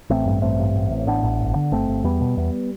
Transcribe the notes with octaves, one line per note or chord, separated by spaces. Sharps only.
A1 A3 C4
G2
A1 A3 C4
G2
A1
A2
A1 B3 D4
A1
G1
D3
G1 A3 C4
G1
E2 G3 B3
B2
E2